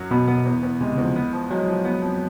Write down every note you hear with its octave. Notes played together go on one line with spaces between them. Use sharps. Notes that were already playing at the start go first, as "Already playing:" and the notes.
Already playing: F#2 F#3
B2 B3
B3
E2
E2
C3 G#3
C#3
E2
F3
B3
F3
F#3 G#3
F3
B3
F2